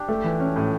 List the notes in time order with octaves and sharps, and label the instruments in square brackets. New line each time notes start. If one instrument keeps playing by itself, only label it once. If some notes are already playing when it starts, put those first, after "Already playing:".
Already playing: [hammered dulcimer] D4 G4
[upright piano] A3
E3
C#4
A2